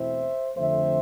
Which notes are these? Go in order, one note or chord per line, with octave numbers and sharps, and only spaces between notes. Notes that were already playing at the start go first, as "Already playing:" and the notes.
Already playing: E2 B2 A3 C4 E4 C5 E5
F2 D3 A3 C4 C5 E5